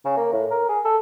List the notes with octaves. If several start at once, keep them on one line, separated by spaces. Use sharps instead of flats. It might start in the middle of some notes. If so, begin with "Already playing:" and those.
C#3
A#3
A2
A#4
G#4
A4